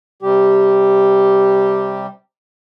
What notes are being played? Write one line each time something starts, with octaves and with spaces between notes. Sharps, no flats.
C3 G3 G4